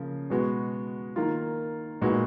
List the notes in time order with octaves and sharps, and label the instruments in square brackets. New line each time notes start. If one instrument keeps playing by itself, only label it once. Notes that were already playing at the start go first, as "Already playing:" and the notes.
Already playing: [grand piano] C#3 F3 A#3
B2 G#3 B3 F#4
D#3 A#3 F4
A#2 G#3 B3 D#4 F#4